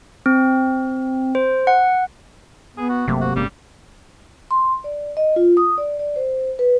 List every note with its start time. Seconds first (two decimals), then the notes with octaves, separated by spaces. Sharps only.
0.26 C4
1.35 C5
1.67 F#5
2.77 B3 G#4
2.89 F#4
3.08 G1 C3 F#3 A3 A#3
3.21 F#4
3.36 G1 G3 G#3 A#3 C#4
4.51 C6
4.84 D5
5.17 D#5
5.36 F4
5.57 D#6
5.78 D5
5.99 D5
6.16 C5
6.59 B4